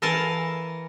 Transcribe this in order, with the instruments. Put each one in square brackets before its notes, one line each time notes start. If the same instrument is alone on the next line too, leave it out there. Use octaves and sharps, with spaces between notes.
[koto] E3 A4 A#4 F5 G#5 A5